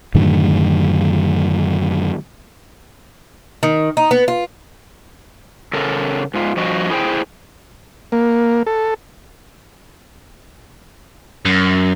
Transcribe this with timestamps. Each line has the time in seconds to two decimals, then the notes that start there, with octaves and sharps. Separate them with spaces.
0.15 F#2 A2 D3 D#3
3.63 D#3
3.97 D#4
4.11 B3
4.28 F4
5.73 C#3 A4 A#4
6.34 G#2 F4
6.56 G2 F3 F#4 D#5
6.90 E4 G#4 C5 G5
8.12 A#3
8.67 A4
11.45 F#2